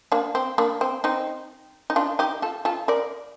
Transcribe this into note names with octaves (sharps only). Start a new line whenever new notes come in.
A#3 D4
C4
A#3 D4
C4
C4 D#4
D#4
D4 F4
D#4 G4
F4 A4
F4 A4
A#4 D5